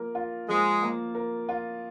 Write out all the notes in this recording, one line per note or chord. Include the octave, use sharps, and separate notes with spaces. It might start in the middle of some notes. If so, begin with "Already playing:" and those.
Already playing: F3 A#3 A#4
F4
F3 G#3
A#3
A#4
F4